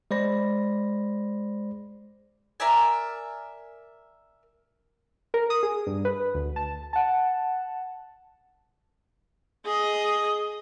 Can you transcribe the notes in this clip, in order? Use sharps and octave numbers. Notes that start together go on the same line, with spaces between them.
G#3 C5 D5 B5 A#6
A#4 D5 E5 G#5
A#4
D#6
G#4
G2
B4
D2
A5
F#5 A5
G#4 D#5